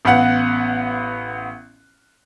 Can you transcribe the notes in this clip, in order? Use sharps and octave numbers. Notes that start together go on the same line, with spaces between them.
A1 B3 F5 F#5 F#6